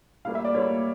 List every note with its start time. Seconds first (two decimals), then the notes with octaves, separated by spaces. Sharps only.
0.25 A2 G3 A#3 F5
0.35 E5
0.45 D5
0.54 A2 G3 A#3 C#5